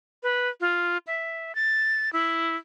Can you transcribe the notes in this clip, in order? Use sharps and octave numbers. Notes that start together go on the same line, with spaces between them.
B4
F4
E5
A6
E4